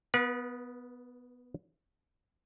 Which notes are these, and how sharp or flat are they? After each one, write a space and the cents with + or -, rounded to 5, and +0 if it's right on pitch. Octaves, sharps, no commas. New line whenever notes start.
B3 +5 B4 -40 F#5 -40